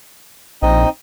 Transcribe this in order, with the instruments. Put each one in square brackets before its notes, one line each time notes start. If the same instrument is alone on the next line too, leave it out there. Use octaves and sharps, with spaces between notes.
[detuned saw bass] A#1 [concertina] C4 D#4 D#5